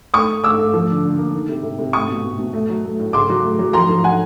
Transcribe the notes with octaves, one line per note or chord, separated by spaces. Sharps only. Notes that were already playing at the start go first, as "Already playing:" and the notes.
A3 C#6 D#6
A3
A3 D6 E6
A3
F3
D3
D3
A#3
D#3
C3
C3
C3
A3 C#6 D#6
B2
B2
B2
A3
F#3
A3
A2
C#3 C6 D6
F#3
A3
F#3
F3 A#5 C6
F3
F3 F#5 G#5